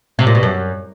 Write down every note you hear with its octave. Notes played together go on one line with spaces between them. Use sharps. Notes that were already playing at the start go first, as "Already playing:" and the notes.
C3
A#2
B2
F#2